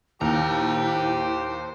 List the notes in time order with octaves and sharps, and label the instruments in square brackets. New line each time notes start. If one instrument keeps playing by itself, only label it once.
[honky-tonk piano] D#2 [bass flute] E4 [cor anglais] G4 [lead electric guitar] C5 A#5